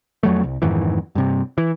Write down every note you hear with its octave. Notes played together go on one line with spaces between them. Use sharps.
F2 F#3 A3
C2
F2 G#2 D#3 E3
G2 C3
E3